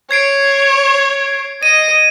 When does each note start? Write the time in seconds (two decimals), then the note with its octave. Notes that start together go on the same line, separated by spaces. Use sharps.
0.11 C#5 G#6 C7 D7
1.63 D#5 D#7